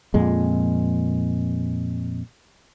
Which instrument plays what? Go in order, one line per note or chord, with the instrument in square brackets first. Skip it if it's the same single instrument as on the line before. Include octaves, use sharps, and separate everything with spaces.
[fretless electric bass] F2 A#2 G#3